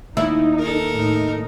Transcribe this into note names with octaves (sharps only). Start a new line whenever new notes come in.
D#2 D#4 E4
A4 A#4
A2 D#4